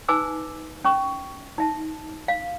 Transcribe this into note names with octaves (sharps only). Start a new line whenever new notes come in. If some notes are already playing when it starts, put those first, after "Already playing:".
D#4 B4 G#5 D6 E6
C#4 C#6
D#4 E5 A5
F5